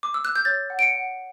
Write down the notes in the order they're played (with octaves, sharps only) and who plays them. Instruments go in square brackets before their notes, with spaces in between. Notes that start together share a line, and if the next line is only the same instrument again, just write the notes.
[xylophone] D6
E6
F#6
G6
C#5 A6
F#5
D7
C#7
F#5